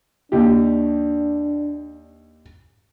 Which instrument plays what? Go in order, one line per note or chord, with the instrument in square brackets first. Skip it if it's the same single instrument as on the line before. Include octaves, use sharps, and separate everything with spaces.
[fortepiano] D#2 G4 [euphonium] D4